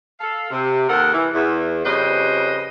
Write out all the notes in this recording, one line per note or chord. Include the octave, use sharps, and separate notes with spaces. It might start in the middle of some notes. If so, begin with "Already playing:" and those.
A4 F5
C3
D#2 A4 A#4 F#5
E3
E2
F2 C#3 G3 B4 C5 D#5